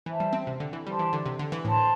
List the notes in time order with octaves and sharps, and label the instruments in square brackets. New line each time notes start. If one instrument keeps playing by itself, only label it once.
[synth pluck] E3 [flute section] C5 E5 A5
[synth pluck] G3
C4
C3
D3
E3
[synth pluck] G3 [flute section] G4 C5 A5 C6
[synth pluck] E3
D3
C3
D3
E3
[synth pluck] A2 [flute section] C5 A5 C6